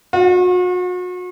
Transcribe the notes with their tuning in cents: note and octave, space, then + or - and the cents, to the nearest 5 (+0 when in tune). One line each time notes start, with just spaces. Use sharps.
F#4 -40